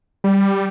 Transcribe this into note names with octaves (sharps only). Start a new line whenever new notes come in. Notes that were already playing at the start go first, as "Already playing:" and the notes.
G3